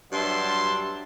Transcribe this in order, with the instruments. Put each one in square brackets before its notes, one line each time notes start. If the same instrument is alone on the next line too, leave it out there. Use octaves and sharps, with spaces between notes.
[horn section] G2 F#3 G3 E5 A5 C6